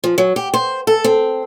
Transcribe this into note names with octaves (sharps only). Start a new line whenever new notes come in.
F3
F#3
G4
C5
A4
C4